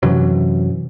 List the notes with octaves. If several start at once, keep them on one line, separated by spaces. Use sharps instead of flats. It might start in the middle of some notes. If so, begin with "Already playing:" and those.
F#2 C3 E3 F#3